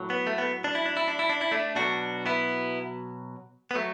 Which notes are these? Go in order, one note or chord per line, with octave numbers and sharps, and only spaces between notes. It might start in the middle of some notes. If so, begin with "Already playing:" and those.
Already playing: A2 F#3
B3
A3
B3
D4
E4
D4
E4
D4
E4
D4
E4
A3 D4
B2 F#3 D4 F#4
B3 E4
B3
F#3 A3